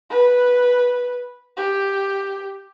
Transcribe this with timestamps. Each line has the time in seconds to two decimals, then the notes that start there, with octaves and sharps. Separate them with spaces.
0.11 B4
1.57 G4